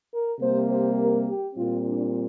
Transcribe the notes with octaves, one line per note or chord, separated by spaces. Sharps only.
A#4
C3 G3 A#3 C5
C5
A#4
G4
A#2 G3 C4 F4
D4